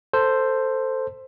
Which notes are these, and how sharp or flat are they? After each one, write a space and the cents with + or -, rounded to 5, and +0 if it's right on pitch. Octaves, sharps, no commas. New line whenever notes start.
A4 +15 C5 +0